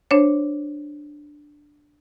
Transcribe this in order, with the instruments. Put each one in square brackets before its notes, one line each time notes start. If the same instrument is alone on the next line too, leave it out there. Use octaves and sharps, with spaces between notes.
[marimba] D4 C5 C#5